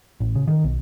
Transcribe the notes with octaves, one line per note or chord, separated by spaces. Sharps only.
A1
C#3
D#3
B1